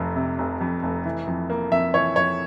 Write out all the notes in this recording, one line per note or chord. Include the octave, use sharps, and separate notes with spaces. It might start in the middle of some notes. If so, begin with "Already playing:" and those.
Already playing: F1 F2
C3
F1
F2
F1
E3
F2
A#3
F2 E5
E3 C#5
F2 C#5